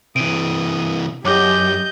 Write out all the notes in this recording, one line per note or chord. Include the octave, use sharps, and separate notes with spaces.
C3 E3 D#6 D7 D#7
F#2 G4 C#5 D#5 D6 G6